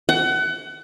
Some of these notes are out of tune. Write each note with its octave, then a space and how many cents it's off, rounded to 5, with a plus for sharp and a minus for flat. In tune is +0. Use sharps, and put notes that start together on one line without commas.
F#5 +30